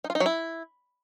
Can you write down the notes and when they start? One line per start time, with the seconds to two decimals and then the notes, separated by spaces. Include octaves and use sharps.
0.04 D#4
0.10 F4
0.15 D#4
0.20 F#3
0.26 E4